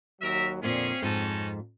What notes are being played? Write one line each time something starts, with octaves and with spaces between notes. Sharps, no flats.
D#2 F#3 A#4 E5
F2 A#2 D3 C4 C#4 G#4 F5
F2 G#2 C#4 D#4 A5